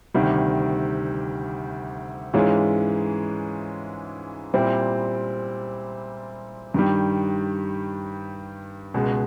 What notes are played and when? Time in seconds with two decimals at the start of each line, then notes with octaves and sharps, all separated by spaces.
0.14 D2 C3 D#3 G3
2.34 G#2 E3 G#3 C#4 F4
4.54 A#2 G3 C4 E4
6.74 G2 D#3 G3
8.94 C#2 B2 G#3